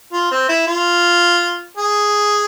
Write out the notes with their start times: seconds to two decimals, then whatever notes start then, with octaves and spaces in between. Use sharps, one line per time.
0.13 F4
0.31 C4
0.49 E4
0.67 F4
1.77 G#4